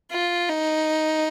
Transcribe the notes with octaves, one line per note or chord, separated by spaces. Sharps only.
F4
D#4